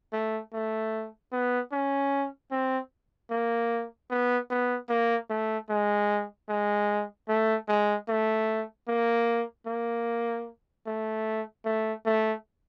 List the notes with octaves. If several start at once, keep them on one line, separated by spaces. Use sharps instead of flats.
A3
A3
B3
C#4
C4
A#3
B3
B3
A#3
A3
G#3
G#3
A3
G#3
A3
A#3
A#3
A3
A3
A3